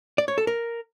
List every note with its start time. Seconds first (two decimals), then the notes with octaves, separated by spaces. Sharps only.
0.18 D5
0.28 C#5
0.38 A4
0.47 A#4